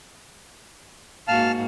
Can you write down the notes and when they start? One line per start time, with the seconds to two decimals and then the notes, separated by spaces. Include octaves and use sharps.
1.28 G#2 A#3 F#4 F5 A5 F6